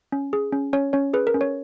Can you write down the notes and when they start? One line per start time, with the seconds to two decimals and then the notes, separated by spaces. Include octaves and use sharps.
0.12 C#4
0.33 G#4
0.53 C#4
0.73 C#4 C#5
0.93 C#4 C#5
1.13 G#4 B4
1.27 A#4
1.34 C#4
1.41 C#5